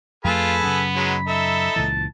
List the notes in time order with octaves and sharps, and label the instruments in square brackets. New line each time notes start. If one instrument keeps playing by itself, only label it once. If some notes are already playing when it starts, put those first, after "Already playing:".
[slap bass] F2 A3 [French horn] F4 [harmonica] G#4 A4 B4 [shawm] B5
[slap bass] F#2 C#3 [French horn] B3
[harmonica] F#3 G#3 D#4
[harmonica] D#4 E5 [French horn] A4
[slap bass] C#2 A#2 E3 [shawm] A5